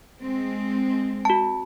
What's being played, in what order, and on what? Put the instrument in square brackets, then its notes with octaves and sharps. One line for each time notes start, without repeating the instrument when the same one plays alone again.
[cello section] G#3 C4
[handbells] F#4 A5